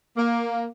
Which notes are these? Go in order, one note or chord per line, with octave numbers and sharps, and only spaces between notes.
A#3